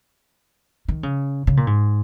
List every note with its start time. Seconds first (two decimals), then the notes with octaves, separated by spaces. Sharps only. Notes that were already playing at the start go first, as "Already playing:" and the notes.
0.88 D#3
1.03 C#3
1.47 C#3
1.57 A#2
1.67 G#2